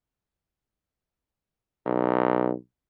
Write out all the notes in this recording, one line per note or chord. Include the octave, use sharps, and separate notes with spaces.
B1